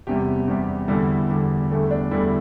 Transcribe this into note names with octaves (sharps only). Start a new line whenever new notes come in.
E2 C3 G3 G4
E2 C3 G3
E2 D3 G3 E4
E2 D3 G3
E2 D3 G3 A3
D4
E2 D3 G3 E4